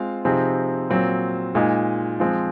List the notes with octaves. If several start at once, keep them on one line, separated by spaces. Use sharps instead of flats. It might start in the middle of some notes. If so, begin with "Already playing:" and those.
Already playing: G#3 C4 F4 F5
C3 F3 C4 D#4 G#4
A#2 F#3 C4
A#2 G#3 D#4
F3 G#3 C4